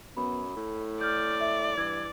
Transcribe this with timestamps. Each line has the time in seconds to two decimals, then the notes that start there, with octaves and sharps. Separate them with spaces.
0.17 F#2 B3 B5
0.56 A2 A4
1.01 D5 F6 G6
1.40 E5
1.77 G2 E3 G#6